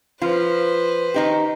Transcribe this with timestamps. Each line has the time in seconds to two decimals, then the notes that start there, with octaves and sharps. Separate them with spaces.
0.21 F3 F4 B4 C5
1.14 D#3 D#4 G4